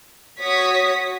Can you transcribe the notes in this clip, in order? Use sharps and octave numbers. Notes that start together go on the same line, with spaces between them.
F#4 C#5 D#6 B6